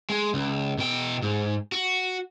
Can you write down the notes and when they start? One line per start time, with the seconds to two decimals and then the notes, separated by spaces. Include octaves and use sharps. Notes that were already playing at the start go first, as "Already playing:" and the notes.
0.10 G#3
0.34 C#2
0.78 B2 G5
1.22 G#2
1.72 F#4